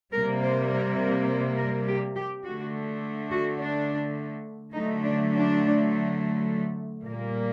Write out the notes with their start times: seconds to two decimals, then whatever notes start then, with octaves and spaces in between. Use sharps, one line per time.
0.13 C3 G3 A#3 A#4
0.42 C5
0.71 A#4
0.99 A#4
1.29 C5
1.58 A#4
1.86 G4
2.15 G4
2.44 D3 A3 F#4
3.30 F#4
3.59 D4
4.75 D3 F#3 A3 D#4
5.04 D4
5.33 D4
7.06 A#2 G3 A#3